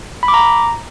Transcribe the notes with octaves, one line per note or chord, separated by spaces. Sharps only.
B5
D6
A#5